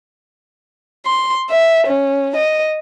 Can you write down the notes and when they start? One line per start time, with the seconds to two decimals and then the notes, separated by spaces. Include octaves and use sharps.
1.06 C6
1.50 E5
1.87 C#4
2.36 D#5